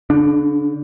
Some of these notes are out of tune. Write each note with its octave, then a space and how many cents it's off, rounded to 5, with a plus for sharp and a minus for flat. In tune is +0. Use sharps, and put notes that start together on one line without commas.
D3 -45 D4 +15